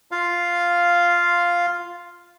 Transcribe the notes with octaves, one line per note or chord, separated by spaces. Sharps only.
F4 F5